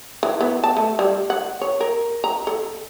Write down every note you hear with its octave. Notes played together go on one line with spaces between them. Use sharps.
E3
B3
A5
A3
G3
F#5
C#5
A#4
A#5
A4